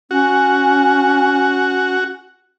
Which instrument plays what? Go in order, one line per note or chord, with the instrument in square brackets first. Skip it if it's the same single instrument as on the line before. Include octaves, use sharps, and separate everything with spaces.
[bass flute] C#4 [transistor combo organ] F#4